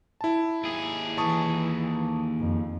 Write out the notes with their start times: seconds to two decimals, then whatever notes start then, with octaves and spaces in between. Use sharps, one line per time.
0.21 E4 A5
0.63 D#2 G#4
1.18 E3 A5 C#6 D#6
2.39 F2